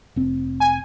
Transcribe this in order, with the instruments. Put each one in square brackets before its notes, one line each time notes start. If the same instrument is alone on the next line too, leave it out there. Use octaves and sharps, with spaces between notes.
[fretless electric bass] F1 C4
[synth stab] G#5